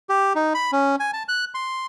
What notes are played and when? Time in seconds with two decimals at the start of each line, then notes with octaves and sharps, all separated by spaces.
0.09 G4
0.35 D#4
0.54 B5
0.72 C#4
1.00 G#5
1.13 A5
1.28 F#6
1.55 C6